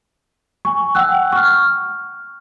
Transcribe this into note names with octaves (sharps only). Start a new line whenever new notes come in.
G#5 C#6
F#5 G5 E6 F#6
C#6 F6